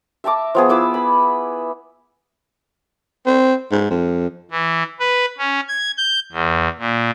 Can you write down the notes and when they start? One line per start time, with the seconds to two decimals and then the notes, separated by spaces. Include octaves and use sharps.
0.24 E5 A5 A#5 D6
0.55 F3 B3 G#4
0.69 E4 B4 D6 E6
0.94 B5
3.26 C4
3.71 G#2
3.90 F2
4.51 E3
5.00 B4
5.38 C#4
5.69 G#6
5.98 G6
6.32 E2
6.79 A#2